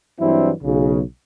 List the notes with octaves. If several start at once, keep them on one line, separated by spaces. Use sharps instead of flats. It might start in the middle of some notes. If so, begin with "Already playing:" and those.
G2 E3 F#3 C4 D4 E4
B1 C#3